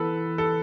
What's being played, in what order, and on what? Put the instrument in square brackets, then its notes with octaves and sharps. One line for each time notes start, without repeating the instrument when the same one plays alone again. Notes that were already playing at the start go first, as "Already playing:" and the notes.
Already playing: [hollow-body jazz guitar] E3 B3 [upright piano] A4 B4
[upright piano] A4